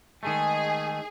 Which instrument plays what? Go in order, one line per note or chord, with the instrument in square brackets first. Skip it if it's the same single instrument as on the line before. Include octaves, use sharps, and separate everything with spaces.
[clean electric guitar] D#3 G#3 A3 [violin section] G#4